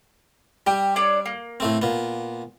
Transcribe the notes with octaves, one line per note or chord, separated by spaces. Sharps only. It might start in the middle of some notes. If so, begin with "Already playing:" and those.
G3 G4
D4 C#5 D5
A#3
A2 A3 C4
A#2 B3